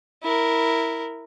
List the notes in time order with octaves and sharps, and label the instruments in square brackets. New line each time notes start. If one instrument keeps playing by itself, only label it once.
[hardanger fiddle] E4 A#4